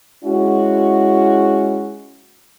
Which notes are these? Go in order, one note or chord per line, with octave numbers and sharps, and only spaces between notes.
G#3 C#4 E4 F#4